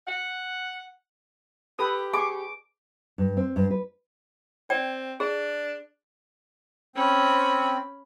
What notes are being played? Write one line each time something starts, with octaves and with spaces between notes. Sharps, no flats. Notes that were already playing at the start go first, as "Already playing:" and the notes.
F#5
G4 A4 B4 D#6
G#4 C#6 D6
G2
C4
G2
B4
C4 D5 G5
D4 G#4
C4 C#4 B5